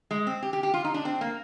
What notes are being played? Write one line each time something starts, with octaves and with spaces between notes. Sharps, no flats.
G#3
C4
G4
G4
G4
F4
D#4
D4
C4
A#3